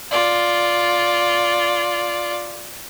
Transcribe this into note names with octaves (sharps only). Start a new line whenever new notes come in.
F4 D5